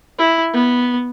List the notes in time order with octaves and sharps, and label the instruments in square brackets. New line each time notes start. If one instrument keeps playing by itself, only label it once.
[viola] E4
B3